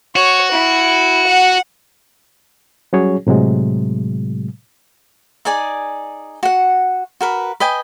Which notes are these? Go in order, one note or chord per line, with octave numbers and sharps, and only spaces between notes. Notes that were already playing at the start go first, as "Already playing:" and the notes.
F#4 C#5
E4
F#5
F#3 G3 C#4 F#4 G#4 C#5
A2 C3 F#3 G#3
D#4 G#4 D5 G#5
F#4 F#5
F#4 A#4 B4
B4 D#5 G5 G#5